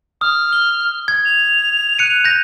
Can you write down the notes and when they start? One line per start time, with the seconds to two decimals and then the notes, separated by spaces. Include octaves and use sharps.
0.21 D#6 F6
0.53 G7
1.08 G#6
1.25 F7
1.98 F#6 C#7 D#7
2.25 G6 A#6